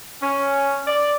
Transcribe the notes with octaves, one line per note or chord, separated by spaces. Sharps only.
C#4
D5